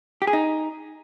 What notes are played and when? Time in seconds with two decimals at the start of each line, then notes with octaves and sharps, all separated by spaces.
0.22 G4
0.27 G#4
0.33 D#4